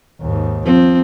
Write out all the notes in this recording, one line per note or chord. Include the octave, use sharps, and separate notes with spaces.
D#2 G#2
F3 C4